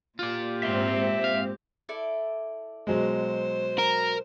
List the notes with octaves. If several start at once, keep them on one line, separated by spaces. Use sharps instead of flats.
A#2 F4 G4 D5
G#2 C4 E5 C6
F5
E4 A4 D5
B2 F#3 G#3 C5
A#4